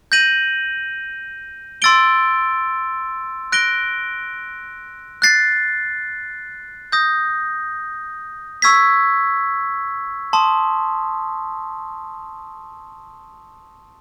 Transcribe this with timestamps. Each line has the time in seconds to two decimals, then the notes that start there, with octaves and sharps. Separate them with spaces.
0.12 G6 A#6 D#7 F#7
1.82 C6 E6 A6 D7 G7
3.52 F#6 A#6 D7 G7
5.22 F#6 A6 C7
6.92 D#6 G6 A#6
8.62 C#6 E6 G#6 B6
10.33 A5 C6 D#6